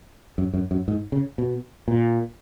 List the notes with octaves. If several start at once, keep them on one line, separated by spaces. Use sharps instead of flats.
F#2
F#2
F#2
G#2
C#3
B2
A#2